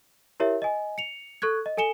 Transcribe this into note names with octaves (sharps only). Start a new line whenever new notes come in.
E4 G4 A#4 C#5 E5
D#5 G#5
C#7 F7
A4 C#6 F#6 G#6
D#5
A4 G#5 C#7 E7 G7